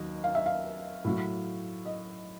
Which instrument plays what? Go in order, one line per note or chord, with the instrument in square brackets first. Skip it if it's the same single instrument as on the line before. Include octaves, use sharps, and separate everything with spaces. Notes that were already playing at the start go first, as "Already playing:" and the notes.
Already playing: [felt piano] D#2 D#3 F#3 D#5
F5
E5
F5
A2 F#3
D#5